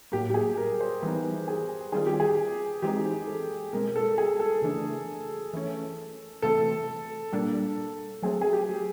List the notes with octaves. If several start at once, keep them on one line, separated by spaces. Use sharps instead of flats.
A2 F#3 A#3 G4
G4
G#4
A#4
C5
E3 G3 B3 D#4 B4
G#4
D#3 G3 C4 F4 G#4
G4
G#4
E3 G#3 C4 D#4 G4
A4
B2 G#3 C4 A#4
A4
G#4
A4
C#3 E3 A3 D4
E3 A3 C#4
C3 E3 A3 C4 A4
A#2 G3 A#3 D4
F#3 A3 C4 G#4
G#4
G4